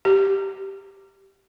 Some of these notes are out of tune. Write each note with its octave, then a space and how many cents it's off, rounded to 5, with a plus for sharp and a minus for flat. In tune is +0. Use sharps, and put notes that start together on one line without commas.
G4 +0